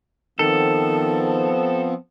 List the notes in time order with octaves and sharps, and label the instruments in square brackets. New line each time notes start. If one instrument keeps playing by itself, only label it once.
[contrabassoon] D#3 [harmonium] F3 B3 C4 [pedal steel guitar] A4